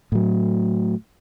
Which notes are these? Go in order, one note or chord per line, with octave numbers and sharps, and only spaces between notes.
A2 F#3